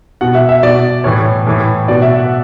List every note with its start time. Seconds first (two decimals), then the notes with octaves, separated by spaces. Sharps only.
0.21 B2 F#5
0.35 E5
0.49 E5
0.63 B2 D5
1.04 A2 E3 C#5
1.47 A2 E3
1.88 B2 D5
2.02 E5
2.16 F#5